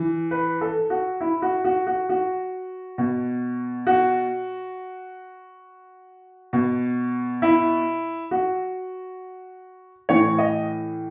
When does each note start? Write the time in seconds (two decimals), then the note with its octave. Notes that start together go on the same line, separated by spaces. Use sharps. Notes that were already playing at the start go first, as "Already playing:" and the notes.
Already playing: E3
0.31 B4
0.61 A4
0.90 F#4
1.21 E4
1.42 F#4
1.65 F#4
1.87 F#4
2.09 F#4
2.98 B2
3.87 F#4
6.53 B2
7.42 E4
8.31 F#4
10.09 A2 E3 C#5
10.39 D#5